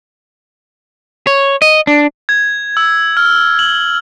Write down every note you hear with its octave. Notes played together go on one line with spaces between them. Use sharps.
C#5
D#5
D4
G#6
E6
F6
F#7